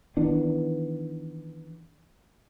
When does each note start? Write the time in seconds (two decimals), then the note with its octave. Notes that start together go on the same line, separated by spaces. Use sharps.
0.17 D#3 E3 B3 D4